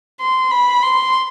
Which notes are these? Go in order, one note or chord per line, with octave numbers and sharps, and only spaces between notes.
C6
B5
C6